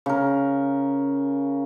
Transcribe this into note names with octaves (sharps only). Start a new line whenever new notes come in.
C#3 A#4